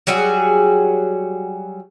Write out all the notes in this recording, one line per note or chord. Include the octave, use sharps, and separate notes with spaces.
F#3 G3 F#4 G#4